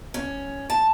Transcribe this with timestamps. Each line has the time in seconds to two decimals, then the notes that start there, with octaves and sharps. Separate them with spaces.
0.14 C#4
0.70 A5